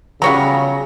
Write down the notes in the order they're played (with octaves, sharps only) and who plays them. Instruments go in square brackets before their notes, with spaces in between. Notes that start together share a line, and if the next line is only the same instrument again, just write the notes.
[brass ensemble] C#3 [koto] F#3 G3 B3 [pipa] F4 C#5 A#5